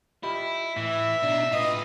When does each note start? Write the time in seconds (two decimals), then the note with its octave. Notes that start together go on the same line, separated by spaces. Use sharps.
0.23 E4 F4 G4 D#5
0.76 A2 E3 E5
1.23 B2 D4 D#4
1.52 A2 F4 B4 D#5